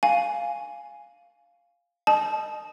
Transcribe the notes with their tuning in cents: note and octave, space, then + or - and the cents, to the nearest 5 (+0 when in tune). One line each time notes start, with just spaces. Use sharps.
F5 +0 G#5 +0
D#5 -20 A5 -30 D#6 +0